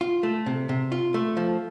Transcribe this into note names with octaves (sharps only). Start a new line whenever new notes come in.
F4
A3
C3
C3
F4
A3
F3